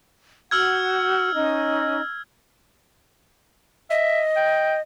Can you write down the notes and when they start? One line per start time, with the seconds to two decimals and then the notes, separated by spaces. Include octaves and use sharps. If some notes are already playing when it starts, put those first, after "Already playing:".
0.51 F#4 F#5 E6 F6 G#6
1.34 C#4 D#4 D#5
3.90 D#5 E5
4.36 G5